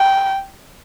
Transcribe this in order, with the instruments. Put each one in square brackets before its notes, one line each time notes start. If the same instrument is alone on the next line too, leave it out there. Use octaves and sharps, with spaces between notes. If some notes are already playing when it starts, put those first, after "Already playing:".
Already playing: [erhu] G5